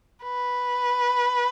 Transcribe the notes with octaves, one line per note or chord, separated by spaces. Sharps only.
B4